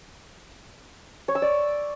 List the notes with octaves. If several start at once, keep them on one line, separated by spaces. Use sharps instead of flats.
C#5
E6
D5